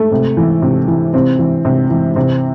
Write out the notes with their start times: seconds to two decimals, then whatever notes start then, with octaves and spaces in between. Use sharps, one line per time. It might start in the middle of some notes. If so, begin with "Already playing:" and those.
Already playing: A3
0.11 C3
0.37 E3
0.62 C3
0.88 E3
1.13 C3 C4
1.39 E3
1.65 C3
1.90 E3
2.16 C3 C4